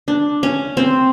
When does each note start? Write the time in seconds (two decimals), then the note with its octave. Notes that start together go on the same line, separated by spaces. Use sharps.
0.08 D4
0.43 C#4
0.77 C4